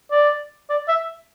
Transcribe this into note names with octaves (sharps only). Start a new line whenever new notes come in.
D5
D5
E5